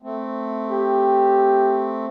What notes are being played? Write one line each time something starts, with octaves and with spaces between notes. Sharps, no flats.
A3 C4
G4